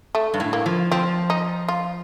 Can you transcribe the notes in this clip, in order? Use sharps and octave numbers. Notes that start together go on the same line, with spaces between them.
A3
G2
A2
A#3
F3
F3 C4
D#4
F4